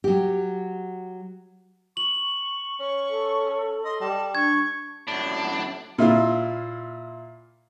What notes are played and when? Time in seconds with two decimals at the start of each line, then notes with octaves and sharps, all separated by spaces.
0.04 F#3 G4
1.97 C#6 F#7
2.80 C#4 C#6
3.10 A4
3.85 D#5 C6
4.00 G3 A5
4.35 D4 C#6 G#6
5.08 F#2 A2 D4
5.98 A#2 E4 F4